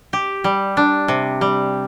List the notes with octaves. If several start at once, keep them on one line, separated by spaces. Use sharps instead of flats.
G4
G3
D4
C3
G3